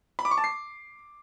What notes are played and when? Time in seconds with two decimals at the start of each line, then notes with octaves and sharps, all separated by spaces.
0.19 B5
0.25 D6
0.31 C#6
0.38 A5
0.44 C7